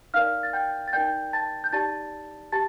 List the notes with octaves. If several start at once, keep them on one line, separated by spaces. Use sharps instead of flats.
D#4 A#4 D5 F5 F6
A6
G5 G6
A6
D#4 A#4 D5 G5 G6
A5 A6
G6
D#4 G4 D5 A5 A6
G4 A5 A6